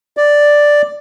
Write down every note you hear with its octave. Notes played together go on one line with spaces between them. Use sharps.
D5